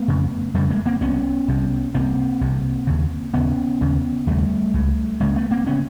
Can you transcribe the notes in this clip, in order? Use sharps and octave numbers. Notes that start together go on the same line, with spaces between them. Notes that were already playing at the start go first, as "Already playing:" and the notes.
Already playing: A3 B3
F2 C#3
F2 C#3 G3 A3
G#3 A#3
A#3 C4
C2 C3 B3 C#4
C2 C3
C2 C3 A#3 C4
C2 C3
D#2 C#3
D#2 C#3 B3 C#4
D#2 C#3
D#2 C#3 G3 A3
C#2 C#3
C#2 C#3 G#3 A#3
A3 B3
A#3 C4
C#3 B3 C#4